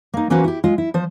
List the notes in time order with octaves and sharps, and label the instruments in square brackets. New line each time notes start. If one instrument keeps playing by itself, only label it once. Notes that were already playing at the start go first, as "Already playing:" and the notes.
[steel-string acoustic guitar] A#3 D#4
E3 A#3 C#4 F#4 B4 C5
E4 G4
G#3 F4
E4
F3 C5